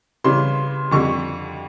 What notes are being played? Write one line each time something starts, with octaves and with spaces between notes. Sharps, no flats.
C#3 E3 G3 C6
F2 D3 G3 C#6